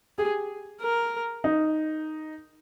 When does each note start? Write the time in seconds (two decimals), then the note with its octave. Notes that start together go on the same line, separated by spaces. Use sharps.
0.18 G4 G#4
0.81 A#4
1.44 D#4